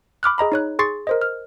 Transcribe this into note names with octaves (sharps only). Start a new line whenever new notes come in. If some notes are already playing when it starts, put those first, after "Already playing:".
B5 D6 F6 F#6
G#4 D#5 A#5 B5
D#4 C#5 F#6
G#4 C6 C#6 A6 C7
A#4 C5 D#5
F6